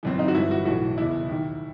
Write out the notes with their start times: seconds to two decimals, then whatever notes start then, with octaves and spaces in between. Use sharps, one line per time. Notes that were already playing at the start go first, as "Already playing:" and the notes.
0.03 G1 F#2 E3 C4
0.19 D#4
0.28 F#4
0.35 G1 G2 E3 E4
0.51 F#4
0.65 B1 A2 E3 F#4
0.97 F#1 E2 B2 E4
1.29 D#2 D#3